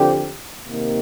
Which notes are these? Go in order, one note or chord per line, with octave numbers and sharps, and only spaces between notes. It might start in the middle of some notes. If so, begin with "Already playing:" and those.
Already playing: D3 F3 C4 G4
C3 D#3 A#3